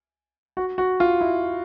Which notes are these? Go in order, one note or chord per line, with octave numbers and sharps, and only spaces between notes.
F#4
F#4
F4
E4